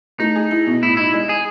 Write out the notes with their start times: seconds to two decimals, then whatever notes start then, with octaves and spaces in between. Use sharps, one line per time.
0.20 A3 D#4
0.36 G#4
0.51 E4
0.67 B2
0.82 A2 E4
0.97 D#4 E4
1.13 G#3
1.29 G#4